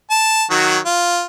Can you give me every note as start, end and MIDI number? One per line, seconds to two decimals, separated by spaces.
0.11 0.44 81
0.50 0.78 51
0.50 0.78 54
0.50 0.78 66
0.86 1.24 65